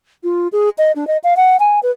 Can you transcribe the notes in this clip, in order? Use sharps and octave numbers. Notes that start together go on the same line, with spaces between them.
F4
G#4
D#5
D4
D#5
F5
F#5
G#5
B4